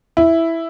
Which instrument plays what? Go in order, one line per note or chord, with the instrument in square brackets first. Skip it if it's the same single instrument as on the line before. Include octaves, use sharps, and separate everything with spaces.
[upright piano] E4